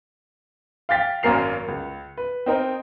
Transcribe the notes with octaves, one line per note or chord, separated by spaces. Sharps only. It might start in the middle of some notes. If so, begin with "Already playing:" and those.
F5 G5 A6 B6
G#1 F#2 A#3 A#4 C7 F7
C#2
B4
C4 D#4 A#4